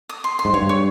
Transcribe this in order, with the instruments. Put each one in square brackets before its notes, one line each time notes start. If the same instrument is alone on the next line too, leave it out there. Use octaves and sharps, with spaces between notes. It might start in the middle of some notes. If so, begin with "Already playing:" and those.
[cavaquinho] D#6
C6
C6
[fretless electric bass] G#2
[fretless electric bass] G2 [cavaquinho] C#5
[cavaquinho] C#5